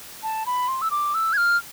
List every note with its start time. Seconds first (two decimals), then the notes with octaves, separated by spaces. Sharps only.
0.23 A5
0.46 B5
0.68 C6
0.82 E6
0.91 D6
1.14 E6
1.33 G#6
1.37 F6